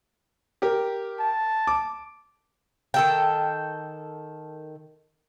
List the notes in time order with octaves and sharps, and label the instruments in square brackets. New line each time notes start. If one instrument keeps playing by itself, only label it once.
[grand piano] G4 A#4
[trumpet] A5
[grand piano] D6
[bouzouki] D#3 A4 G5